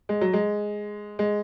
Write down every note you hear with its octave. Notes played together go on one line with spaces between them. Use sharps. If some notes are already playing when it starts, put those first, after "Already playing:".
G#3
F#3
G#3
G#3